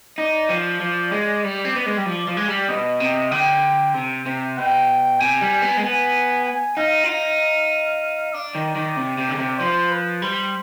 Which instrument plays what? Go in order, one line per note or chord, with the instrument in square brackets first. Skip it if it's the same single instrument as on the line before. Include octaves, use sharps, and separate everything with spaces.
[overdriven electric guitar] D#4 [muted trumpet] D5
[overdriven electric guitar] F3
F3
G#3
G3
C4
B3
G#3
G3
F3
F3
G#3
G3
[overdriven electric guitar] B2 [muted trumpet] D#5
[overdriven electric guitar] C3
[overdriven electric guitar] D3 [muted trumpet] G5
[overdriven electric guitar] C3
C3
[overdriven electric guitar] B2 [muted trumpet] G5
[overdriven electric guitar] C3 [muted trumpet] G#5
[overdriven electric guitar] G3
B3
G#3
[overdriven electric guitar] B3 [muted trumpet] G#5
[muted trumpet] G#5
[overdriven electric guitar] D#4 [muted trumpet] F5
[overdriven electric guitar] F4
D#4
[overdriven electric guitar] D4 [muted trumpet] D5
[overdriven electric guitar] D#3
D#3
C3
C3
D3
C3
[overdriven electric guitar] F3 [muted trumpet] C5
[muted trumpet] B4
[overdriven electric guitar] G3 [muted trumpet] C5